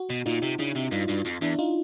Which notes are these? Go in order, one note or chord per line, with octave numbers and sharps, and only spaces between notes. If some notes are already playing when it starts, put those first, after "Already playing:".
Already playing: F#4
B2
A#2 D#4 F4
C3
C#3 D4 E4
C3
G2 D#4 F4
G2
F2
E2 D4 E4
D#4 F4